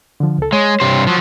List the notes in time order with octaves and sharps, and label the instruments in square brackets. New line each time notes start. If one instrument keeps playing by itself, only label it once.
[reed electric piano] D3 F3
C#2 A4
[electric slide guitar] G#3 [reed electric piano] C#5
[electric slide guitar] G2 C3 C5
F3 F#3